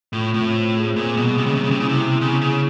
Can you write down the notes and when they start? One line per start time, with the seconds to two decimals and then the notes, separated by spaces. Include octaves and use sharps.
0.13 A2 F4
0.34 A2 C4
0.54 C5
0.75 G#4
0.96 A#2 A#3
1.16 B2 G3
1.37 C3 G3
1.46 C#3
1.55 C3
1.59 C#4
1.64 C#3
1.71 C3
1.79 C#3 E4
1.89 C3
2.00 B3
2.21 C#3 B3
2.41 C#3 G#4